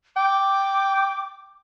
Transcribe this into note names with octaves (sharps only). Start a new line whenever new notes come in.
G5 D6